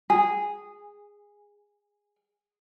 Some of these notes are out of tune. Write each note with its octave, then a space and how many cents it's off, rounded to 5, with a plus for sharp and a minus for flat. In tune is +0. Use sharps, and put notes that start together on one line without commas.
G#4 -10